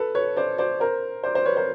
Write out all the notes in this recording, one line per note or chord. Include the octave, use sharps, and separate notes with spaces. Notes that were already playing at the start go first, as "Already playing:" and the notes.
Already playing: A4 B4
B4 C#5
C5 D5
C5 D5
A#4 C5
C5 D5
C5 D5
B4 C#5
A#4 C5